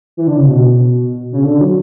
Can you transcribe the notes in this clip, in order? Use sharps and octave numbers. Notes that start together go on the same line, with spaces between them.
E3
D3
C#3
B2
C#3
D3
F#3